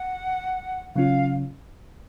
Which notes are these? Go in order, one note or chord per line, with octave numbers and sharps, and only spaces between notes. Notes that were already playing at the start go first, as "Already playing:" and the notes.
Already playing: F#5
C#3 F#3 C#4 F4 F5